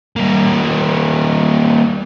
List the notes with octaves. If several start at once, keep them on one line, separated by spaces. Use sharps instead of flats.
G3 A#3